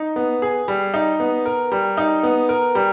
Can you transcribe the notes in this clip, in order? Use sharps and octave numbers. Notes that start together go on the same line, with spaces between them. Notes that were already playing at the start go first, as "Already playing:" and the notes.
Already playing: D#4
B3
G#4
G3
D#4
B3
A#4
G3
D#4
B3
A#4
G3